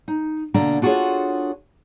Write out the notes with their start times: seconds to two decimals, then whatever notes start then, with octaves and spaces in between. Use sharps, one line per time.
0.08 D#4
0.54 B2 D3 A#3 D4 A#5
0.82 D4 F4 F#4 G#4 A4 C#5